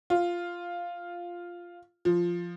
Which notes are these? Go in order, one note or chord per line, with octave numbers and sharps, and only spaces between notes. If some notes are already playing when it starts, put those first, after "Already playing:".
F4
F3